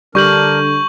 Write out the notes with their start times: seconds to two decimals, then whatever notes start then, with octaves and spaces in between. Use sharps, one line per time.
0.15 D3 G3 D4 G4 A#4 C#6 G6 F#7